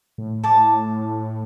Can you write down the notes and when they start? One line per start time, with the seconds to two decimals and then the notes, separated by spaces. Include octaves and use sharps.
0.18 A2
0.43 A2 A5 D6